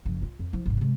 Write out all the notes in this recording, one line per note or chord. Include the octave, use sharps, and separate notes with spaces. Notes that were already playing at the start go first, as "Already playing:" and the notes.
F#1 F3
F4
F2
F3 E4
G#1 C3
C3 G#3